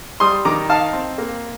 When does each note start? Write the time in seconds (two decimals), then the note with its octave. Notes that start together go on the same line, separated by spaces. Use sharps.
0.20 G3 C6 D#6
0.45 D#3 A#5 D6
0.69 D#4 F5 A5
0.93 C4
1.18 A#3